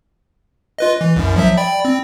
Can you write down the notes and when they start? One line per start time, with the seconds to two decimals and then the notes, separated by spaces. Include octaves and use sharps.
0.78 F4 B4 D#5
1.01 E3
1.16 C2 F#2
1.36 F3 F#3 E5
1.57 D5 G5 B5
1.85 C4